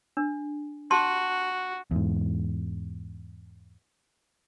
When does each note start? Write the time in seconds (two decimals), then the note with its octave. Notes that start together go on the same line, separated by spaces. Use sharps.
0.17 D4
0.91 F#4 A5 C6
1.91 E2 G#2